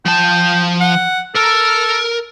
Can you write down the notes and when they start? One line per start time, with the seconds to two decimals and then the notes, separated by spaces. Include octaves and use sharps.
0.05 F3 G5 A5
0.80 F#5
1.35 A4 A#4